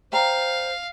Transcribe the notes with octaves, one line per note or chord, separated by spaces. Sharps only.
C5 D5 F5 G5 A#5